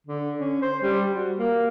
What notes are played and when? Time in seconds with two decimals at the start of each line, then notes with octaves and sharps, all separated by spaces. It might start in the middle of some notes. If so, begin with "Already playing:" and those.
0.07 D3
0.39 C#4
0.62 C5
0.82 G3
1.14 F#4
1.38 A#3